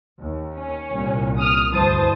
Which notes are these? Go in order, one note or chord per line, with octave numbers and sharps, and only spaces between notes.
D#2
C#4
C2 A#2
D#6 F6
D2 G2 E3 C5 A5 D#6